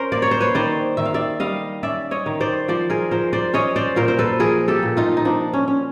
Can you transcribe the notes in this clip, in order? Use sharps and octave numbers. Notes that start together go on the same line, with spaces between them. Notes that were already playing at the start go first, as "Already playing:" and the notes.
Already playing: C#4 A#4 C5
A#3 D5
C#5
C5
B4 C#5
D#3 C5 D5
D#3 E5
F5
D5 E5
G3 D#5 F5
C#4 D5 E5
C#5 D#5
D#3
C5 D5
F3 C5 D5
G#4 A#4
F3 A#4 C5
C5 D5
C#4 C#5 D#5
C5 D5
A#2 A#4 C5
C5
A4 B4
F3 G#4 A#4
G4 A4
A#2
D#4 F4
D#4
F3 D4
C#4
C#4